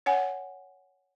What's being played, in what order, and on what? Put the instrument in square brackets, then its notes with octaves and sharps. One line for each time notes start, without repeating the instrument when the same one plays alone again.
[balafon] C#5 F#5 G#5